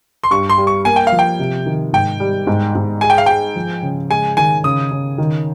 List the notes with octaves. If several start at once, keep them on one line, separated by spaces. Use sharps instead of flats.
C6
G2 C#6
C6
G3
C#6
A#3 G#5
G5
F5
F3
G5
C3
D#3
G#2 G5
G3
G#2
G#2
G#4 G#5
G5
F5
G#4 G5
F3
C#3
G#3 G#5
D#3 G#5
C#3 D#6
C#3
D#3